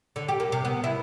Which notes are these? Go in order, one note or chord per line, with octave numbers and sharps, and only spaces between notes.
D3
G4
A#3
C3
B3
E4